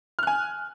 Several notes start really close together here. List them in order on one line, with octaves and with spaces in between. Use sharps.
F6 F#6 G#5